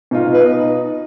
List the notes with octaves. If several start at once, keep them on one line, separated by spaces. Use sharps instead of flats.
B2 D#4 F4
B4
D#4 D#5